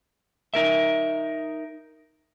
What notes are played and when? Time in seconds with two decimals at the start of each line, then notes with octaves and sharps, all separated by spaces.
0.54 D#4 A#4 E5